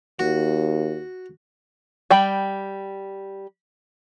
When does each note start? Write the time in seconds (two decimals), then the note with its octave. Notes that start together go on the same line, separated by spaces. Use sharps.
0.19 D#2 F#4
2.10 G3 G5 B5